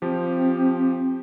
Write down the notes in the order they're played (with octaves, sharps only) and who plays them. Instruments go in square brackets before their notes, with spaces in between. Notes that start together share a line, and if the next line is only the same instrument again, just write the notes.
[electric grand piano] F3 G4 [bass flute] C4